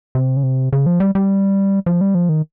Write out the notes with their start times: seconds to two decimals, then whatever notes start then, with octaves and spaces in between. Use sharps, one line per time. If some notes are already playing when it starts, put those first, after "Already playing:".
0.15 C3
0.37 C#3
0.43 C3
0.73 C#3
0.86 F3
1.00 G3
1.15 G3
1.86 F3
2.01 G3
2.15 F3
2.29 D#3